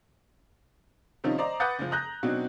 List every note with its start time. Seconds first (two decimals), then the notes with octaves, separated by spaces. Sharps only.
1.24 C3 D#3 F3 G3 C#4 D#4
1.38 C5 D5 D#5 A#5 D6
1.60 B4 F#5 D6 D#6 G6 A6
1.79 F#1 F3
1.91 A#5 D#6 F#6 G6 A#6
2.23 B2 F#3 C4 D4 D#4 F#4